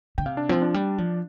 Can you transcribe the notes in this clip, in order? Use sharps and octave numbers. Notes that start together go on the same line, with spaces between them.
D3 G5
C3 F5
D4
F3 C4
D4
G3
F3